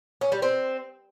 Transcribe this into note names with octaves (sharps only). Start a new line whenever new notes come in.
C#4
G3
C4